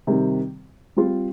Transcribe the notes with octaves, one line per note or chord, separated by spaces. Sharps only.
C3 D#3 G3
G3 C4 F4